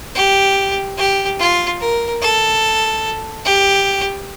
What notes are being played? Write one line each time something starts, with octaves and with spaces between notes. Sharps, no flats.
G4
G4
F4
A#4
A4
G4